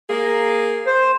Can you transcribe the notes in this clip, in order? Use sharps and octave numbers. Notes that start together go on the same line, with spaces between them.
A#3 G#4
C5